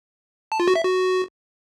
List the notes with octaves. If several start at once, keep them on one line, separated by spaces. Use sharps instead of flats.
A5
F4
F#4
E5
F#4